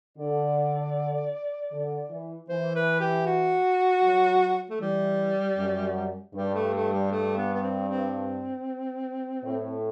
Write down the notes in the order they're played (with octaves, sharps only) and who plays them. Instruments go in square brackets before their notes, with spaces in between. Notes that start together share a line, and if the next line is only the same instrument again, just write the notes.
[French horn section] D3 [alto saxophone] D5
[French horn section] D3
E3
[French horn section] E3 [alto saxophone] C5
[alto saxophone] B4
G4
F#4
[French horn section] F#3
[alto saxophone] A3
[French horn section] E3 [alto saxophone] G3
[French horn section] F#2
[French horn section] G2 [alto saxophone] G3
[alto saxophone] A3
A3
G3
A3
B3
B3
C4
C4
[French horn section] A2